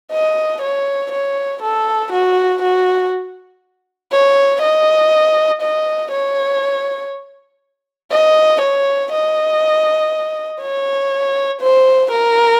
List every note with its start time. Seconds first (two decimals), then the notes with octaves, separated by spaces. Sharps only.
0.12 D#5
0.62 C#5
1.12 C#5
1.62 A4
2.12 F#4
2.62 F#4
4.12 C#5
4.62 D#5
5.62 D#5
6.12 C#5
8.11 D#5
8.61 C#5
9.12 D#5
10.61 C#5
11.61 C5
12.11 A#4